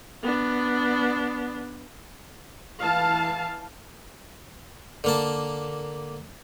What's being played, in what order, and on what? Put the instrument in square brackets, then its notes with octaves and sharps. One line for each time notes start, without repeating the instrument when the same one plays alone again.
[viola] B3 D4
[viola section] E3 F5 A5
[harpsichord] D3 A#3 A5